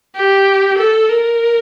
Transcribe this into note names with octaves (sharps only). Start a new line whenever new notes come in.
G4
A4
A#4